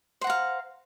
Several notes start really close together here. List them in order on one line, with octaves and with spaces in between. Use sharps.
C5 F#5 A#5 F5